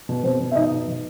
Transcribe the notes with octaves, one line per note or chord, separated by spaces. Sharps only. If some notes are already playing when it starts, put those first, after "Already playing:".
B2
B2 C4 C5
B2
E5
B2 D#4 D#5
B2
B2